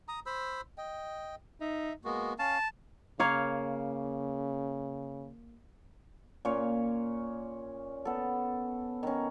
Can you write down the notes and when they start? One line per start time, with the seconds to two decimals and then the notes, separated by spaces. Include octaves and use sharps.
0.08 A#5 D#6
0.26 C5 B5 E6
0.78 D#5 G5
1.61 D#4 E5
2.04 G#3 A#3 B3 F#4
2.39 C#4 F5 A5
3.20 C#3 A#3 C#5 F5
6.45 A#2 C#4 C#5
8.05 B3 A4
9.03 D#3 C#4